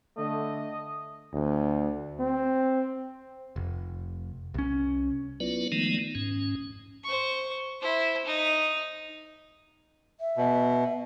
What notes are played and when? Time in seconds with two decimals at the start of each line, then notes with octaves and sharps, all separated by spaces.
0.18 D3 A3 D#5
1.33 D2
2.19 C4
3.56 F1
4.54 C2 C#4
5.40 F#3 B3 E4 F4 B4 D5
5.72 D#3 F3 G#3 A3 B3 D#4
6.15 G#2 C#4
7.04 C5 C#6
7.81 E4 C5
8.25 D#4
10.21 E5
10.37 B2